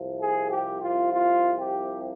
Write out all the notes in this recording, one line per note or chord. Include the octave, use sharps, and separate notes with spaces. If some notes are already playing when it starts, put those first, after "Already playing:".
Already playing: C2 C3 F3
G#4
G4
F4
F4
G4